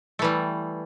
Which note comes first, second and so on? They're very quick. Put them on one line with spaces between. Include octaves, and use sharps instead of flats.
A3 E3 G3